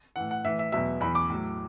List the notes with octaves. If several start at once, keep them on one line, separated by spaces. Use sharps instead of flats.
A2 E3 F#5
F#5
A2 E3 E5
E5
E2 B2 F#3 E5
E2 E3 B5
D6
A2 F#3